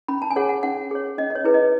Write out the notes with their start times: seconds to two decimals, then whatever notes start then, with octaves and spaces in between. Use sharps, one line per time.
0.08 C#4 B5
0.22 A5
0.31 G#5
0.36 G#4 C#5 F#5
0.49 F#5
0.63 C#4 F#5
0.91 G#4 C#5
1.18 C#4 D#5
1.30 D#5
1.35 C#5
1.44 E4 G#4 B4
1.54 D#5